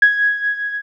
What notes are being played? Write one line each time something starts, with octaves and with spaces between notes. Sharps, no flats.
G#6